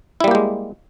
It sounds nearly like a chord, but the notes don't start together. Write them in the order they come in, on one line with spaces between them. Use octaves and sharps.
E4 G3 A#3 G4 G#3